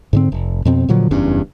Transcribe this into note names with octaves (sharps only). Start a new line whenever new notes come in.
G#2 D3 C4
F1
F2 B2 C4
A#2 D3 F3 F#3
F#1 E2 G2 C#4